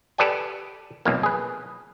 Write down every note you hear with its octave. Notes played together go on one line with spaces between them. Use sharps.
G4 A4 B4 D5 G5 G#5
B1 F2 A#3
G#4 B4